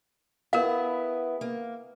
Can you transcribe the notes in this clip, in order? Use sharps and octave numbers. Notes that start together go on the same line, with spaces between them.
B3 E4 G#4 A#4 F5
A#3